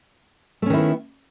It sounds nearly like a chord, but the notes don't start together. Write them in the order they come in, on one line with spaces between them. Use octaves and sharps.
A3 C#4 D#3 E4 B3